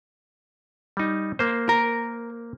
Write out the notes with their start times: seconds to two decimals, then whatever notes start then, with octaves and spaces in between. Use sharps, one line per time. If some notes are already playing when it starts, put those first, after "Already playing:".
0.97 G3 D#4
1.39 A#3 C5
1.69 A#4